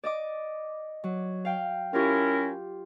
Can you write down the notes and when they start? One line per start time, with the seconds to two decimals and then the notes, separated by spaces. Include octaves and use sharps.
0.04 D5 D#5 D6
1.04 F#3
1.45 F5 G5
1.93 C#4 E4 F4 G4 A#4